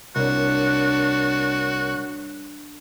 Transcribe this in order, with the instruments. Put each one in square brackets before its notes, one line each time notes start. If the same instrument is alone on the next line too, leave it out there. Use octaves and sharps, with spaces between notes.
[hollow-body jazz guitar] C2 [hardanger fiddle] D4 [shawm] F#4 [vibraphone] A#4 C#5